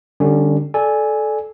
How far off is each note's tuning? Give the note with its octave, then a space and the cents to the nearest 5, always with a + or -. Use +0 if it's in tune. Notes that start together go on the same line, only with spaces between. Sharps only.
D3 +25 G3 +10 C#4 +0
A4 -15 D5 +0 G#5 +0